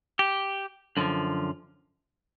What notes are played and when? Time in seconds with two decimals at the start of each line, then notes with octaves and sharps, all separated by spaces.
0.19 G4
0.97 F#2 D3 F3